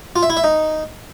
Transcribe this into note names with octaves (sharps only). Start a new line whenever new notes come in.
F4
E5
E4
E5
D#4